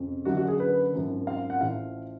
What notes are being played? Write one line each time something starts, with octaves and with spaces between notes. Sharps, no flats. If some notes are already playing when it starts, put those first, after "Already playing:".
Already playing: F1 F2 C#3
F#1 F#2 D3 F#3 F#4
F#4
G#4
B4
G#1 F#2 F3
F5
F#5
A1 A2 F3 F5